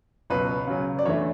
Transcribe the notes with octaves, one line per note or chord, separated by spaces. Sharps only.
C#2 B2 F#3 B4
C#3 F#3 C#4
D5
E2 D3 A3 E4 C#5